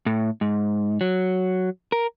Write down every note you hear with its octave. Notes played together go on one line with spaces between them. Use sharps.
A2
G#2
F#3
A#4